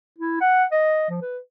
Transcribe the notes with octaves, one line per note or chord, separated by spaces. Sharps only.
E4
F#5
D#5
F3
B4